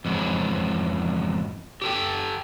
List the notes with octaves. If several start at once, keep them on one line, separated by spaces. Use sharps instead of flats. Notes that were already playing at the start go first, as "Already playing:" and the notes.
F2 G#2 E3 F#3
G4 A4 G5